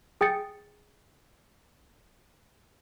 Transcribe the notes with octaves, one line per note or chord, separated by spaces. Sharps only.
G#4 G5 D#6 A6 C#7